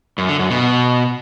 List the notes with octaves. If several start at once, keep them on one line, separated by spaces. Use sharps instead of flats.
F#2
D3
F#2
B2